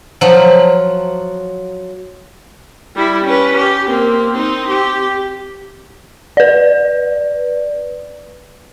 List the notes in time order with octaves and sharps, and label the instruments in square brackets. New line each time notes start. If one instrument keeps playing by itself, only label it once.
[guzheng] F3 F#3
[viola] G3 E4
C#4 B4
G4
A#3 C4
C4 D#4
G4
[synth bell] B4 D5